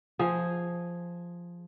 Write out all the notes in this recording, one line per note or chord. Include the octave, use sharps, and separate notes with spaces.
F3 G#4